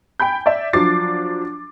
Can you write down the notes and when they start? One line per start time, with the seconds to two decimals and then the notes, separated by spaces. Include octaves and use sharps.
0.20 G5 G#5 B5 G6
0.46 D5 E5
0.73 F3 F#3 D4 D6 A6 C7